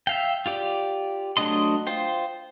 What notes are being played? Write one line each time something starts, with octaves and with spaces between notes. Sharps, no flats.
E5 F5 G5
F4 G4 D5
F#3 A3 D4 D#5 C6
F4 C5 G5